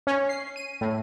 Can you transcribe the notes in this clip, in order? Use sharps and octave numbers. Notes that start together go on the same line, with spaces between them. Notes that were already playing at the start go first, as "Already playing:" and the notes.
C#4
C7
D#7
A2